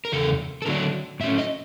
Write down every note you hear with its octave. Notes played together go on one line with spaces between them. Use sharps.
A#4
E2 C#3 A4
A4
D3 F#3 A3 D4 A#4
A2 F#3 A3 C#4 E5
D#5